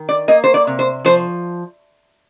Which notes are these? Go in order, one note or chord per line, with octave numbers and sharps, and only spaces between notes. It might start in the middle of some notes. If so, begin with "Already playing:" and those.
Already playing: D#3
D5
A#3 D#5
C5
D5
C3
C5
F3 C5